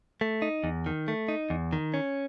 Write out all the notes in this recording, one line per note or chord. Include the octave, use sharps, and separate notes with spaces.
A3
D#4
E2
D#3
A3
D#4
E2
D#3
C#4